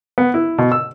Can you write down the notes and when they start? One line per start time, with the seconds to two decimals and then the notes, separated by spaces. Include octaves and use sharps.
0.18 B3
0.34 E4
0.58 B2
0.72 E6